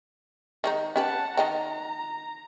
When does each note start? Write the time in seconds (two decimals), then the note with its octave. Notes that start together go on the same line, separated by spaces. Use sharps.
0.64 D#3 G#3 D#4
0.96 C#4 G4 B4 F#5 A5
1.37 D#3 D#5 G5 A#5